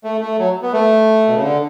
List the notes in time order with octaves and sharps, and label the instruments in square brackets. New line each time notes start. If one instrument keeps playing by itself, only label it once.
[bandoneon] A3
A3
F#3
B3
A3
B2
C#3
D3